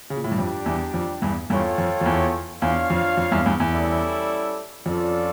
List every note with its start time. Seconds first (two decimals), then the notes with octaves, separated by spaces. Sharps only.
0.10 C#3
0.16 A#2
0.24 A2
0.32 G2
0.38 F2 G3 D4 G4
0.66 E2
0.94 F2
1.22 E2 G2
1.50 E2 G2 F4 A4 C#5 G5
1.78 F2
2.01 F2
2.06 E2
2.62 E2 D4 F4 C#5 F5
2.90 F2
3.17 F2
3.31 E2 G2
3.46 E2 G2
3.60 E2
3.74 G3 C#4 E4 A4 D5
4.86 F2 C#4 F4 A4 D5